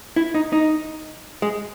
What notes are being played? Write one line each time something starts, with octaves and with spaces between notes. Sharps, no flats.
E4
D#4
D#4
G#3